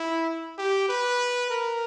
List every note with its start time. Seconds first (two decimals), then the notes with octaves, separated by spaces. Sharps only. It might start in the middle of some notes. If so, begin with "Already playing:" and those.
Already playing: E4
0.58 G4
0.89 B4
1.50 A#4